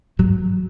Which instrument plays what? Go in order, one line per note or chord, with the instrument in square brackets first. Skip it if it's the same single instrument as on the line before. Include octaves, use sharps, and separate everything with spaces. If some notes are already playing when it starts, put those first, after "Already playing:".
[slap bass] G#2 F#3